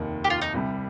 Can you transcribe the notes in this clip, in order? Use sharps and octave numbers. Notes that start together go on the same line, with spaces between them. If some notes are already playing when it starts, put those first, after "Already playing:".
Already playing: F1 D#2 D#3
G4
F4
D#4
C2 C3 G3